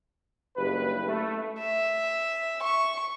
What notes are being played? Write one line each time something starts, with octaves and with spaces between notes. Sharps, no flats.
F#1 G2 G4 B4
A3
E5
C#6